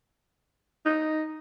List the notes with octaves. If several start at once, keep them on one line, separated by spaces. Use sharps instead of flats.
D#4